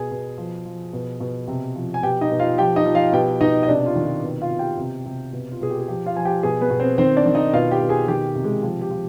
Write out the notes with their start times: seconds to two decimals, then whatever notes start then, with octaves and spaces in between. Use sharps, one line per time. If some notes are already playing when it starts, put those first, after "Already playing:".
Already playing: B2 G#4 G#5
0.11 B2
0.38 F3
0.65 F3
0.93 B2
1.20 B2
1.48 C3
1.75 F3
1.94 G#5
2.03 B2 G4 G5
2.21 D#4 D#5
2.31 B2
2.40 F4 F5
2.58 F3 G4 G5
2.76 D#4 D#5
2.86 F3
2.95 F4 F5
3.13 B2 G4 G5
3.41 B2 D#4 D#5
3.63 D#5
3.68 C3 D4 D5
3.86 F4
3.95 D#3
4.05 F4
4.23 B2
4.42 F4 F5
4.50 B2
4.59 G4 G5
4.78 C3
5.06 C3
5.33 B2
5.52 F4
5.61 B2 G#4
5.70 G4
5.79 G#4
5.88 F3 G4
6.06 F4 F5
6.16 F3 G#5
6.25 G4 G5
6.43 B2 G#4 G#5
6.61 B3 B4
6.70 B2
6.80 C4 C5
6.98 D#3 C4 C5
7.16 D4 D5
7.26 D#3
7.35 D#4 D#5
7.53 B2 F4 F5
7.71 G4 G5
7.81 B2
7.89 G#4 G#5
8.08 D#3 G4 G5
8.35 C3
8.44 G#3 G#4
8.63 F3 G4
8.82 G4
8.91 F3